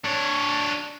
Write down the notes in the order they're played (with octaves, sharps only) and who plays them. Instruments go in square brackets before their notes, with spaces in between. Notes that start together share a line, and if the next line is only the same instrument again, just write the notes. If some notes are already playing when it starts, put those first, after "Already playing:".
[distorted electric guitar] D4 C#5